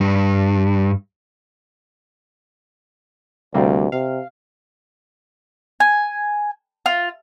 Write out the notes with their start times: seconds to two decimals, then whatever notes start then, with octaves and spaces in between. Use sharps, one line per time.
0.01 G2
3.54 D2 C3 G3 A#3
3.92 C3 F5
5.80 G#5
6.86 F4